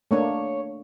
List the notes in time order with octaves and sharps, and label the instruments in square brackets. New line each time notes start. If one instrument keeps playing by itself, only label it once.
[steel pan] A3 A#3 D4 [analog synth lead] C#5